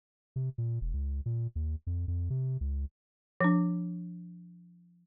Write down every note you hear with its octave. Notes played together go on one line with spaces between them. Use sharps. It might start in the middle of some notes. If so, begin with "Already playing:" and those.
C3
A#2
E1
C#2
A#2
D#2
F2
F2
C3
C#2
F3 D4